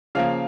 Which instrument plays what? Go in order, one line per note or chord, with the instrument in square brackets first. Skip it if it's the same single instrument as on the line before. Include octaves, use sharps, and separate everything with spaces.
[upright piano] C#3 F3 A#3 F5